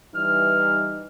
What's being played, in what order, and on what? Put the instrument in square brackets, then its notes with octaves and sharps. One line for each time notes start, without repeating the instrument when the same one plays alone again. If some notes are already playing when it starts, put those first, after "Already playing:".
[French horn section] E3 G3 D#4 [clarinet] F6